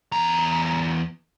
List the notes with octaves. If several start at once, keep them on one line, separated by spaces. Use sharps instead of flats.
E2 A#5